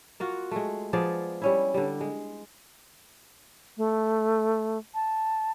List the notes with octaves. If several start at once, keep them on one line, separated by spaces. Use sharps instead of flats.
A#3 F4 F#4
G#3 A3
F3 B3 G#4 D5
G3 C#4 E4
D3 G3
G#3
A3
A5